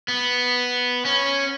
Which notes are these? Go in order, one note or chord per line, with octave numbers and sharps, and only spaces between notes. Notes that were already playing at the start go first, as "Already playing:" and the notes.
B3
C#4